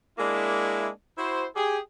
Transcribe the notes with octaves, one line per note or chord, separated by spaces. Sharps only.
G#3 A#3 D4 E4
E4 F#4 C5
G4 G#4